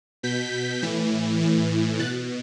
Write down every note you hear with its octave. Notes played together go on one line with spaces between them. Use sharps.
B2 G6 B6
A2 E3
A2 E3
B2 F#6 A6